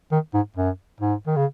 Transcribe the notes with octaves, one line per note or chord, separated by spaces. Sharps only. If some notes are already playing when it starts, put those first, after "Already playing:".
D#3
G#2
F#2
G#2
D#3
C#3